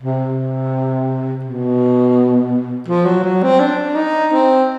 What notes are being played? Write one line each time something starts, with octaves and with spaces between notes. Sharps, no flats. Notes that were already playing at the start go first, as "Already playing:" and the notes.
C3
B2
F3
F#3
F#3
C4
D4
D#4
C4